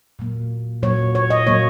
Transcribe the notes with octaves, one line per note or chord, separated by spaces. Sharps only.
A#2 F#3 A#3
A#2 F#3 A#3 C#5
C#5
D#5
A#2 F#3 A#3 C#5